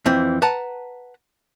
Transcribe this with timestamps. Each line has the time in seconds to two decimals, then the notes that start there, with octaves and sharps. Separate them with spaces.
0.06 F2 E3 C4
0.42 B4 F#5 A5 A#5